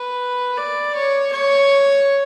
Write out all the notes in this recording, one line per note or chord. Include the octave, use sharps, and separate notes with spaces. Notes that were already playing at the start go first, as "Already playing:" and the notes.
Already playing: B4
D5
C#5
C#5